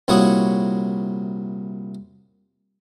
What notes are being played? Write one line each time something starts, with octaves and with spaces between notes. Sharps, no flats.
C2 A#2 E4 F#4 C#5 D#6